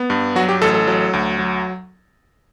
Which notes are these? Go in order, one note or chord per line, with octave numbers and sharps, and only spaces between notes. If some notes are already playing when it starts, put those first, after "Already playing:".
Already playing: B3
G2
F#3 F#4
G4
A1 A4
A4
F#3
D2
F#3